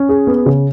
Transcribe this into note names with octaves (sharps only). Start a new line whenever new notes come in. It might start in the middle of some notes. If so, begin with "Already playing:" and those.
Already playing: C#4
G#4
B3
C#3